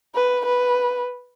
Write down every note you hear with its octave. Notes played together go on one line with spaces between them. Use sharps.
B4
B4